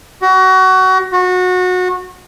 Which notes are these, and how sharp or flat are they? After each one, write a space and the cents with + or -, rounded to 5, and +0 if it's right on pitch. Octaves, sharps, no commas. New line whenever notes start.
F#4 +25
F#4 -25